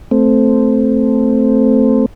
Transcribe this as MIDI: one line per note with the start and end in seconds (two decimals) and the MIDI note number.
0.11 2.06 57
0.11 2.06 60